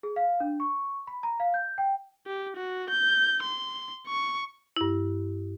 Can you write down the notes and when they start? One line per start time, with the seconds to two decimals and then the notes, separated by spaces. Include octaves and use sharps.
0.03 G#4
0.16 F5
0.40 D4
0.60 C#6
1.07 B5
1.23 A#5
1.40 F5
1.54 G6
1.78 G5
2.27 G4
2.57 F#4
2.90 G6
3.43 C6
4.08 C#6
4.76 G2 E4